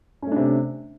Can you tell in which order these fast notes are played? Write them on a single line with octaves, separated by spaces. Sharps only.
C#4 A3 D4 C3